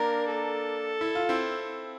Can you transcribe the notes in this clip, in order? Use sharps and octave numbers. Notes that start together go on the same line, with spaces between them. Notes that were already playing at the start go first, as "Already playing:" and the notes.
Already playing: A#3 D4 A#4
A4
E4
F4
C4 E4